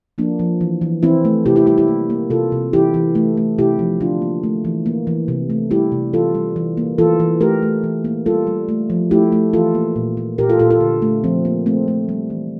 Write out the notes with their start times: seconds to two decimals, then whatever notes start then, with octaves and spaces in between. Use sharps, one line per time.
0.18 F3 A#3 D4
0.39 F3
0.61 E3
0.81 E3
1.03 E3 C4 E4
1.25 A3
1.46 C3 E4 G4
1.56 E4 G4
1.67 G3 E4 G4
1.78 E4 G4
1.88 A#3
2.10 A#3
2.30 C3 F4 A4
2.52 C3
2.73 E3 E4 G4
2.94 E3
3.15 A3
3.37 A3
3.58 C3 E4 G4
3.79 F3
4.00 D3 D4 F4
4.22 A#3
4.43 A3
4.65 E3
4.86 A#3
5.07 E3
5.28 C3
5.50 A3
5.71 G3 E4 G4
5.92 C3
6.13 E3 F4 A4
6.35 G3
6.56 E3
6.77 A#3
6.98 E3 F4 A4
7.20 E3
7.41 A3 G4 A#4
7.62 A3
7.84 E3
8.05 A#3
8.26 G3 F4 A4
8.47 G3
8.69 A3
8.90 F3
9.11 A3 E4 G4
9.32 A3
9.53 E3 F4 A4
9.75 A#3
9.96 A#2
10.17 A#3
10.38 A#2 G4 A#4
10.49 F4 A4
10.59 A#2 F4 A4
10.70 F4 A4
10.80 D3
11.02 A3
11.24 F3 C4
11.45 A#3
11.66 A3 C4
11.88 A3
12.09 G3
12.30 E3